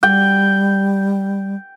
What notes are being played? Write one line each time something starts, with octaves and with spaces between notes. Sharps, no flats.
G3 G5